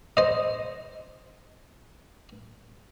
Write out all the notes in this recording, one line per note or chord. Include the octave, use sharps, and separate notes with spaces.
C5 D#5